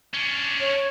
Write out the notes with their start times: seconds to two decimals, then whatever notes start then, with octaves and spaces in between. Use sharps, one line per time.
0.14 C#4 D4
0.60 C#5